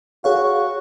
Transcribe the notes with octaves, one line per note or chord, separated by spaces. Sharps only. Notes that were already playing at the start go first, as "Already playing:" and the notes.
F#4 G#4 C#5 F5